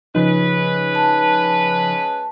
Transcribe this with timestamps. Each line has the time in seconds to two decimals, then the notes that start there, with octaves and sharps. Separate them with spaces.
0.15 C#3 F3 G#3 C#4 D#4 B4
0.95 A5